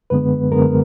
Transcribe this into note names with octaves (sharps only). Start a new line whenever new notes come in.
F#2 D3 G#3 B3 B4
F#2 D3 G#3 B3 A#4